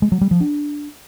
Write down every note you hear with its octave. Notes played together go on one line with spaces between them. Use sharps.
G#3
F#3
G3
F3
D4